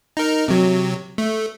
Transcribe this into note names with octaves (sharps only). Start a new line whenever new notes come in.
D#4 A#4
C3 F#3
A3